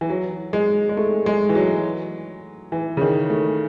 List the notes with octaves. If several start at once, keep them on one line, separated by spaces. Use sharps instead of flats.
E3
F#3
G#3
G#3
A3
G#3
E3
F#3
E3
C#3
D#3
A3